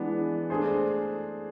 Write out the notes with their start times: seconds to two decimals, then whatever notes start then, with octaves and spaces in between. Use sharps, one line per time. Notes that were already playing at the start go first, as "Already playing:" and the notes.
Already playing: E3 G#3 B3 D4
0.50 A3 D4 G#4 C5